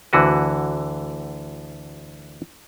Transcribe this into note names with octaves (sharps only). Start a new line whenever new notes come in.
D2 D3 E3 F#4 B4